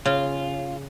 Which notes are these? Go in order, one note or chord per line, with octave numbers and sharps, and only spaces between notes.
C#3 F4